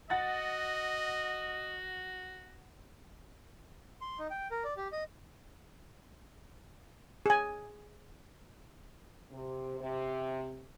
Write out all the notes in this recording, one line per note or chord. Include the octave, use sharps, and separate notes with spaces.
F#4 D#5 F#5 A6
C6
D#4
G5
A#4
D5
G4
D#5
G#4 G#5
C3
C3